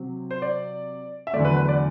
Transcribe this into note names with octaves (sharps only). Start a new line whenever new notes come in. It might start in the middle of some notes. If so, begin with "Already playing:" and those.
Already playing: C3 F#3 C4
C5
D5
E5
E2 D3 F#3 A3 D5
B4
B4
D5